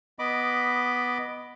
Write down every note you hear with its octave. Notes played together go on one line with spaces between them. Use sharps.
B3 D#5 B5 D6